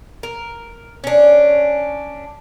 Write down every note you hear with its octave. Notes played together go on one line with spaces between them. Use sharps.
A#4
C#4 D4